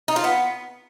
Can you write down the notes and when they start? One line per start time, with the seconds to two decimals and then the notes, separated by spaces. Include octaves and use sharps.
0.08 D#4
0.16 F4
0.24 B3